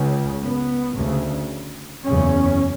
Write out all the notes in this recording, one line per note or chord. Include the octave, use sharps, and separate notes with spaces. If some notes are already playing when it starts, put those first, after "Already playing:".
Already playing: C#2 C#3
B3
D2 C#3
F#1 E2 C#3 C#4